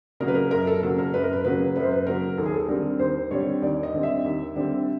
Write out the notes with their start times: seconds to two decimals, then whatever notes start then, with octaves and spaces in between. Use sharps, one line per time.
0.20 C#3 F#3 A#3 A#4
0.28 B4
0.35 A#4
0.51 F#2 A#4
0.67 A4
0.82 C#3 F#3 A#3 A4
0.98 A#4
1.14 F#2 B4
1.24 A#4
1.33 B4
1.44 C#3 F#3 A#3 B4
1.76 F#2 B4
1.83 C5
1.91 B4
2.07 C#3 F#3 A#3 A#4
2.37 D#2 A4
2.46 G#4
2.54 A4
2.68 D3 G3 C4 A#4
2.99 D#2 C5
3.31 D3 G3 C4 C#5
3.62 D#2 D5
3.83 D#5
3.93 D3 G3 C4
4.03 E5
4.24 D#2
4.56 D3 G3 C4